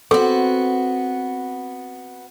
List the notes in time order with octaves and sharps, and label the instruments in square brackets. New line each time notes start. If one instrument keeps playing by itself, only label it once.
[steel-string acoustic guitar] B3 F#4 [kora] C4 [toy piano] A4